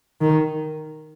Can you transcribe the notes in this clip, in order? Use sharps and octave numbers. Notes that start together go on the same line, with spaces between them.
D#3